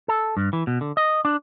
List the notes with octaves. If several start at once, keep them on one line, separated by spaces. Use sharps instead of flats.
A4
G2
E3
B2
D3
D#5
D4